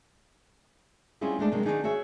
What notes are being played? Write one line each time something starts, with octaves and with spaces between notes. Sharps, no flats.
G3 C4 C#4 E4 F4 G#4
G#3 A3 D4
C3 F#3 G#3 F#4 A#4
D#3 G#3 B3 D4 D#4 G#4
F#4 G#4 C#5 E5